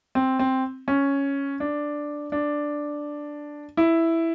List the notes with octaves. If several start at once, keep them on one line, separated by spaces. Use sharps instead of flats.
C4
C4
C#4
D4
D4
E4